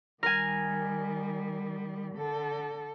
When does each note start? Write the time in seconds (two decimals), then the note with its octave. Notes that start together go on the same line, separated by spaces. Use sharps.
0.23 D#3 G3 A#4 G#5
2.14 D3 A4